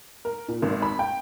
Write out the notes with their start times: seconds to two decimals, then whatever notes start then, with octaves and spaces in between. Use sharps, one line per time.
0.25 A#4
0.48 A#2
0.62 G#1
0.82 B5
0.99 G5